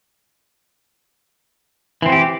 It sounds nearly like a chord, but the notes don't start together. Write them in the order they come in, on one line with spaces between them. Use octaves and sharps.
E3 C4 F#4 G4